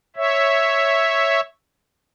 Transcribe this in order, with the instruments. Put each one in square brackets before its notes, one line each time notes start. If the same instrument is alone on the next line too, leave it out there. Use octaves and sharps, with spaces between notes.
[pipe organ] C#5 E5